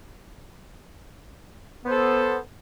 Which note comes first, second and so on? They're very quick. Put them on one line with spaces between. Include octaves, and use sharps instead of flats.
B3 C5 A4